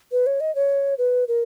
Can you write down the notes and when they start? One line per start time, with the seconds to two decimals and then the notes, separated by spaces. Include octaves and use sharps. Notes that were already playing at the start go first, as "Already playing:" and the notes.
0.12 B4
0.27 C#5
0.40 D#5
0.55 C#5
0.98 B4
1.28 A#4